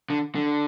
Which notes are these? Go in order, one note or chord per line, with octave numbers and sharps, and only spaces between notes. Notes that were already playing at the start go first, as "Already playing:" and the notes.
D3
D3